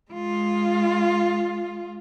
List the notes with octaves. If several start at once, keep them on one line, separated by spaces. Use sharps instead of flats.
G#3 F4